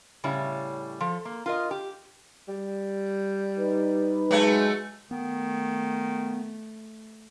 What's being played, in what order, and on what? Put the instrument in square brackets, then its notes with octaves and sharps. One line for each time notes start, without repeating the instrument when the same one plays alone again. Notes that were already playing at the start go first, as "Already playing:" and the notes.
[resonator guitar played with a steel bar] A2 C#3 G3 E4 C#5
F3 A4
A#3
F4 A#4 D#5
G4
[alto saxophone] G3
[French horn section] D#4 B4
[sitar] F#3 A3 [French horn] G#3
[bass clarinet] D#3 [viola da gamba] A3 [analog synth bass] B3